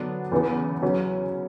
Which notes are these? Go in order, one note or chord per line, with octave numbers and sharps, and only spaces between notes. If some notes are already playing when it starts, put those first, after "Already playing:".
Already playing: D3 F#3 B3 D4
E2 C#3 E3 B3
C#3 F#3 C#4